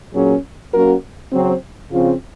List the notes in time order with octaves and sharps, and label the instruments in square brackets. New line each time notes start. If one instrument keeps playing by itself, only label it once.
[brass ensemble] A#2 F#3 C#4 G#4
F#3 A#3 C#4 F#4 A#4
C#3 F#3 C4
C#3 F3 C4 F4